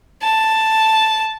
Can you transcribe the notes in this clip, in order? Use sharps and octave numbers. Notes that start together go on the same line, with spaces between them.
A5